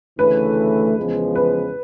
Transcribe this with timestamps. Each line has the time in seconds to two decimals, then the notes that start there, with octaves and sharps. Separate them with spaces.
0.19 D2 C#3 E3 A3 B4
0.97 E2 C#3 F3 G#3
1.35 B4